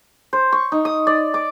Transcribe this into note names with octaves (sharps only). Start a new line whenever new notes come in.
C5
C#6
D#4
D#6
D5
D6